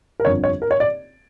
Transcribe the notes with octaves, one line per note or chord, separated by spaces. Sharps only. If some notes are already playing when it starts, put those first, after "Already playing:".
A#4
G1 F2 D3 C#5
C#5
A#4
C#5
D5